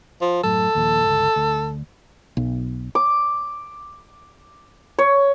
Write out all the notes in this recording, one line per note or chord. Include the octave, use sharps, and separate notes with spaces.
F3
F#2 A2 F#3 A4
D#2 A#2 F3
G1 C#2
D2
B1
D6
C#5